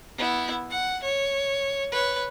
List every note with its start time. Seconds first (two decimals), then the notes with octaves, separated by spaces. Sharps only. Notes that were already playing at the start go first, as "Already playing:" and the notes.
0.18 B3 E4
0.70 F#5
1.03 C#5
1.92 B4 C#5